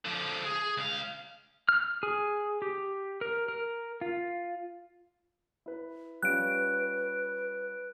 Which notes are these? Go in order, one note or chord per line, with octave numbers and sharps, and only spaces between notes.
D3 F3
G#4
C#2 F5
F6
G#4
G4
A#4
A#4
F4
E4 B4
G3 C#4 F4 B4 F#6 D7